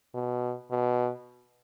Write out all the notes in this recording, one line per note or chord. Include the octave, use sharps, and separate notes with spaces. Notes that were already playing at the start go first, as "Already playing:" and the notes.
B2
B2